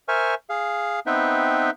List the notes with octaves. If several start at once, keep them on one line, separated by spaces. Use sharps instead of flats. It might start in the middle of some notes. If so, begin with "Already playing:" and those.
A#4 C5 E5 G#5 C#6 F6
G#4 F5
B3 C4 D#4 B4 E5 G5